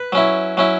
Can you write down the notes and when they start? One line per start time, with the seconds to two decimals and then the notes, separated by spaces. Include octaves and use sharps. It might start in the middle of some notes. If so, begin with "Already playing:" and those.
Already playing: B4
0.12 F#3 C#4 E4
0.57 F#3 C#4 E4